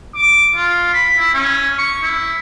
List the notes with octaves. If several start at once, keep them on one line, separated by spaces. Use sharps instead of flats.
D6
F4
B5
E4
C#4
C#6
E4